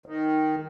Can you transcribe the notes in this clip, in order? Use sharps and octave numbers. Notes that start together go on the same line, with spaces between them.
D#3